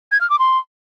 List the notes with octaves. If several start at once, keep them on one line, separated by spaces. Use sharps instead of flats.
G#6
F6
D6
C6